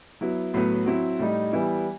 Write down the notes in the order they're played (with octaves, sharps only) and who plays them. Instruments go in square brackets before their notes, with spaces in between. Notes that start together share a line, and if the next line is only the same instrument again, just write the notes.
[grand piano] F#3 B3 E4
A2 F#3 B3
F#3 C4 E4
A2 G3 D#4
E3 G3 B3 E4